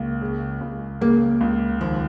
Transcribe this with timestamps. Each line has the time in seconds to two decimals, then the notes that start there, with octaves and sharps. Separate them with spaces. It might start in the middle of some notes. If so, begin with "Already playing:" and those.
Already playing: C#2 A#3
0.21 C#3
0.61 C#2
1.01 C#3 A#3
1.41 C#2
1.81 D#2 F3